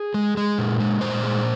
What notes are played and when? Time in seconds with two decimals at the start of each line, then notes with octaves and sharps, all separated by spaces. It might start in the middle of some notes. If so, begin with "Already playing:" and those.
Already playing: G#4
0.14 G#3
0.37 G#3
0.59 A#2
0.80 G#3
1.01 A#2 C5
1.23 G#3